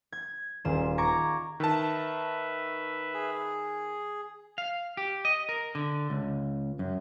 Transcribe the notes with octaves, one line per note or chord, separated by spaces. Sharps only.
G#6
D#1 F4 G#4 E7
A#5 C#6 D6 G#6 A#6
D#3 B4 E5 A5
G#4
F5
G4
D#5
A#4
D3
C#2
F#2